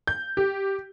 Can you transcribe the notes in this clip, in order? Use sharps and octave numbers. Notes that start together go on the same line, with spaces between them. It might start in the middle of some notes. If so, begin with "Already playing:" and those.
G6
G4